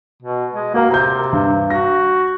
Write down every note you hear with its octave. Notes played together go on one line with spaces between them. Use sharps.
B2
G#3
A#3 F#4 A#4
C3 A#5 G6
G2
F#4 A#6